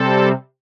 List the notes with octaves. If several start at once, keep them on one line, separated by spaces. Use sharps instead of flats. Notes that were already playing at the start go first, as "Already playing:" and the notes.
Already playing: C3 G3 C4 A4